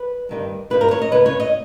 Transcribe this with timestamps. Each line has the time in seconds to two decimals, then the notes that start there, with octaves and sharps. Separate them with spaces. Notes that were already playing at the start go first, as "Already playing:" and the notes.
Already playing: B4
0.29 G2 D#3 G3
0.70 G2 D#3 G3 B4
0.81 A#4
0.91 C#5
1.02 D#5
1.12 C#3 G#3 D#4 B4
1.26 C#5
1.40 D#5